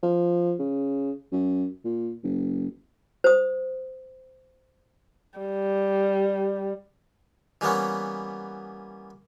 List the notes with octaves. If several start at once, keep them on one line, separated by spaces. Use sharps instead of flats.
F3
C#3
F#2
A#2
F#1
C5 D#6
G3
E3 G3 A#3 B3 C#4